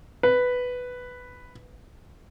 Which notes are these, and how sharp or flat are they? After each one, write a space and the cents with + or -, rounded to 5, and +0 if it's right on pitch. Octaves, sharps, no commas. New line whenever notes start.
B4 +5